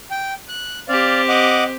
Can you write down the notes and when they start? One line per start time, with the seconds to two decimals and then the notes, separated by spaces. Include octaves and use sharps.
0.11 G5
0.49 F#6
0.88 C4 G4 D5 F5
1.29 D#5 F#5 D6